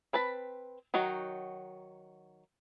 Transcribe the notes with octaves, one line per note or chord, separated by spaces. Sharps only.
C4 B4 A5 B5
D#3 F#3 D#4 F#4